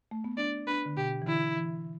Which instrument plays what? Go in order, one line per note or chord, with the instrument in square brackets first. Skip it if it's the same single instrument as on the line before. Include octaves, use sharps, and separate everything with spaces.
[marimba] A3
B3
[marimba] D4 [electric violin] D5
[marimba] D4 [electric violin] B4
[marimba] D3
[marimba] B2 [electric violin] G4
[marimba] E3
[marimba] D3 [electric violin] E4
[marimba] E3